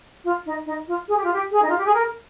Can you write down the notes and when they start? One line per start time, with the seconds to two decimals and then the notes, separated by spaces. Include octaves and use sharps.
0.24 F4
0.46 D#4
0.66 D#4
0.88 F4
1.08 G#4
1.16 G4
1.24 F4
1.33 G4
1.51 G#4
1.62 D#4
1.69 F4
1.77 G4
1.85 G#4
1.93 A#4